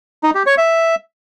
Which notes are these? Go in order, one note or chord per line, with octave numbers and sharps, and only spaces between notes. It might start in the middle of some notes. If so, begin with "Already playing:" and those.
D#4
G4
C#5
E5